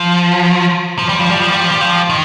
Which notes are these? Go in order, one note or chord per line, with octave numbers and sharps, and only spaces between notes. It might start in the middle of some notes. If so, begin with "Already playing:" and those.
Already playing: F3
F3
G3
F3
G3
F3
G3
F3
G3
F3
D#3